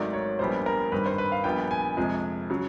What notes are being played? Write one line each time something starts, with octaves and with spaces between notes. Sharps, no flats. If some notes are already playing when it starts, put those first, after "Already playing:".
Already playing: G#1 G#2 D#3 F#3 A3 D5
C#5
A#1 A#2 G3 B3 C5
A#4
G2 D#3 G3 C4 B4
C5
B4
F5
A#1 A#2 G3 B3 G5
G#5
F2 C3 F3 G#3
C#3 F#3